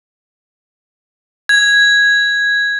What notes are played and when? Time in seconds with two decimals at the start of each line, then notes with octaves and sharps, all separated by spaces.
1.49 G#6